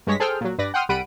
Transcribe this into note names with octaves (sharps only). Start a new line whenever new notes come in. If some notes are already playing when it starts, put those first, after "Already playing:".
G2 G#3 C#5 A#6 B6
G#4 A4 C5 G5 F6
A#2 F#3
G2 B4 D5 A#6
F#5 G5 C6 D#6 F6
C2 G3 F#5 B5 D7 D#7